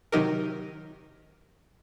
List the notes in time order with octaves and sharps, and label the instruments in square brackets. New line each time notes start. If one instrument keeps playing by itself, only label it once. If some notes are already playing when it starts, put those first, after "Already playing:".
[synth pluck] C3 D#3 F#3 D#4 G4 A#4